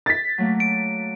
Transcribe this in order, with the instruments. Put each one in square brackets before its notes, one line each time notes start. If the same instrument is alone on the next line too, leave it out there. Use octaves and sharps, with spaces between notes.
[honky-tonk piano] A6 B6
[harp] F#3 A3 A#3
[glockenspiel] D7